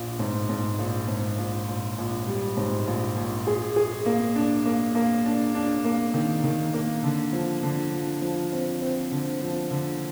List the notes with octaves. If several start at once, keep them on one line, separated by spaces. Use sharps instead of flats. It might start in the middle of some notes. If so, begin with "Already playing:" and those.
Already playing: A#1
G#2
G#2
A#1
G#2
A#1
A#1
A#1
G3
G#2
A#1
A#1
G#4
G#4
A#3
D4
A#3
A#3
D4
D4
A#3
D#3
D#3
A#3
D3
F3
D3
F3
F3
C4
C4
D3
F3
D3